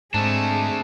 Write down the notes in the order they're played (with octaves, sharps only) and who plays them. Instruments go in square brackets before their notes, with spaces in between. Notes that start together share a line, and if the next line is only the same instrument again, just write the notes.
[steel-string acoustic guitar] G#2 [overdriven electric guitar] A3 D4 [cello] C4 G#4 [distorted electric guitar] A5